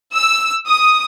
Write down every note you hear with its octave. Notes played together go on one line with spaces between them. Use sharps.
E6
D#6